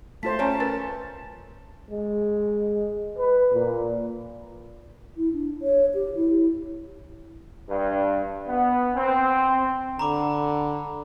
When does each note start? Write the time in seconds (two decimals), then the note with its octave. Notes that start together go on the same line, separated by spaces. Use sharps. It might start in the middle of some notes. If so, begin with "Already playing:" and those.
0.23 A3 F4 C5 A5 B6
0.39 C#4 C#5 G#5 A#5
0.60 A#4 B4 A6
1.91 G#3
3.18 B4
3.53 A#2
5.17 E4
5.33 D4
5.62 C#5
5.94 G4
6.15 E4
7.68 G2
8.48 B3
8.96 C4
9.99 D3 A#5 B5 D6